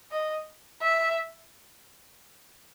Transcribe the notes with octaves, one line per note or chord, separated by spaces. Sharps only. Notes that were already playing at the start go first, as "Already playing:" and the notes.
D#5
E5